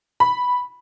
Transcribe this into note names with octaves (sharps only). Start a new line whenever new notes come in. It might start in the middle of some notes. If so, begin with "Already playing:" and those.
B5